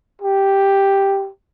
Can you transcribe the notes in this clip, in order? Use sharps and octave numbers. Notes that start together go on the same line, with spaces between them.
G4